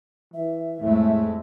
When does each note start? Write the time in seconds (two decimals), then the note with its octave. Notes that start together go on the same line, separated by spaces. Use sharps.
0.34 E3 E5
0.81 F2 A2 G#3 A3